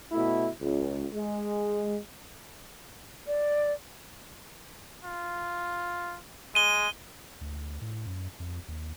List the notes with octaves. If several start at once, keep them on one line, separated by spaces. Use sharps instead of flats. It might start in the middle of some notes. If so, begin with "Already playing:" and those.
B2 A3 E4
C#2
G#3
D5
F4
G#3 D#7 G7
D2
A2
F#2
F2
D#2